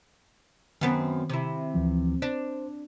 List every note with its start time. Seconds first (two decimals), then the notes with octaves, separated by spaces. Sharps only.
0.81 F#2 D#3 B3 C4
1.30 C3 E4
1.74 D2 E3 F3
2.22 D4 C5